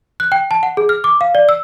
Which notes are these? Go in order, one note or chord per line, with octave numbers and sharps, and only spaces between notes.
F#6
G5
A5
F#5
G#4
F6
D6
F5
D5
E6